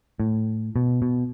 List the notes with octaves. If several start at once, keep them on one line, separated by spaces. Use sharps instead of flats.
A2
B2
B2